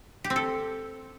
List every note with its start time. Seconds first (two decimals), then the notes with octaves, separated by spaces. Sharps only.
0.24 G4
0.30 C4
0.36 A4